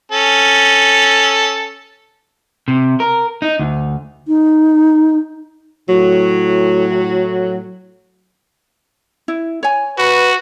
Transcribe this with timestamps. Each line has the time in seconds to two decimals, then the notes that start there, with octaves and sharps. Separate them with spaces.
0.12 C#4 A4
2.68 C3
3.00 A#4
3.42 D#4
3.59 D2
4.28 D#4
5.89 A2 F#3
9.28 E4
9.63 C#5 G#5
9.98 F#4 B4